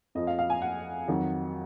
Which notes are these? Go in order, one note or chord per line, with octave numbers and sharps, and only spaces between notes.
F2 F3 D#5
F5
F5
G#5
F#5
F2 D#3 F#3